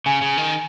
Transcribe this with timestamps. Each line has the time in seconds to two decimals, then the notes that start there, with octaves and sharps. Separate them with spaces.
0.06 C#3 G#5
0.22 C#3
0.37 D#3